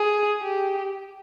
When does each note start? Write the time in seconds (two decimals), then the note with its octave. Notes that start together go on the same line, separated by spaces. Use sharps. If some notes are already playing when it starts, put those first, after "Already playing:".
Already playing: G#4
0.42 G4